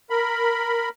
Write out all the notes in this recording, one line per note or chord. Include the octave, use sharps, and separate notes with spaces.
A#4 B5